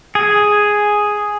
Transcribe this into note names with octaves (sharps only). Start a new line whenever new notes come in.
G#4